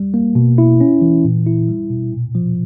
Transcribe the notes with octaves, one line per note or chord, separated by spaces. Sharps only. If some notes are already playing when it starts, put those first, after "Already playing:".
Already playing: G3
A#3
B2
E4
C#4
E3
A#2
E4
G3
B2
A#2
F3